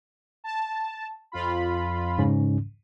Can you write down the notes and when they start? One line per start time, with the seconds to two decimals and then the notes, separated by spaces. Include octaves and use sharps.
0.44 A5
1.32 F2 F4 B5
2.18 G#2 C#3 C#4